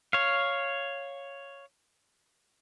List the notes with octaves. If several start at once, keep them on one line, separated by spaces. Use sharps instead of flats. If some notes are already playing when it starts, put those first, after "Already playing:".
C#5 F5